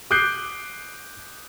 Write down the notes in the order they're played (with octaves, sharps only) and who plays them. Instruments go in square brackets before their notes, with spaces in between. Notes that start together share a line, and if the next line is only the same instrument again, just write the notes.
[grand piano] D6 D#6 F#6 G6 C7 D7